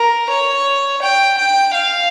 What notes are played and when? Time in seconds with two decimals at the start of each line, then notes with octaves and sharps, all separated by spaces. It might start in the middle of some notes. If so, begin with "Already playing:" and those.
Already playing: A#4
0.30 C#5
1.02 G5
1.38 G5
1.74 F5